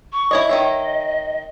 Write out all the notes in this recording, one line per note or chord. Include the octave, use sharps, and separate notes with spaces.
C#6
E4 C#5 D#5
D#3 C#5 D#5 E5